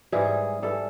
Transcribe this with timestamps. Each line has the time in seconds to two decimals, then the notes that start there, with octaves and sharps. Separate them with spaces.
0.12 G#2 E3 G3 G#4
0.62 G#2 E3 G3 A4